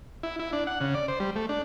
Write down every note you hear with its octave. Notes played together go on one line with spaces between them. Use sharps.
E4
E4
D4
F#5
C#3
D5
C5
G3
A3
D4